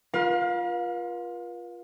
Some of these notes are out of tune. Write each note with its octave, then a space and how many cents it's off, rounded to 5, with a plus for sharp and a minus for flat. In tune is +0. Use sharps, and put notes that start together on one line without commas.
F4 +0 B4 -45 F5 +30